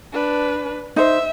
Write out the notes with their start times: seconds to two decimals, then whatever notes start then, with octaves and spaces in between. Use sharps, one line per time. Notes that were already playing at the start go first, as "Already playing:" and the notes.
0.13 D4 B4
0.96 D#4 C5 E5